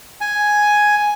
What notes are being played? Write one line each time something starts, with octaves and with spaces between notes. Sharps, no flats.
G#5